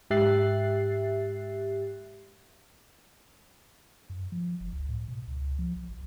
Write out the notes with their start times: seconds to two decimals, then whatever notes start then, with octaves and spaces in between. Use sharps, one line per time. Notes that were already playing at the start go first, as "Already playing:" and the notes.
0.10 G#2 G4 E5 F#6 A6 C7
4.10 F#2
4.32 F3
4.61 F#1
4.73 C#2
4.89 A2
5.08 B2
5.27 C#2
5.59 F3
5.76 B1
5.90 A#1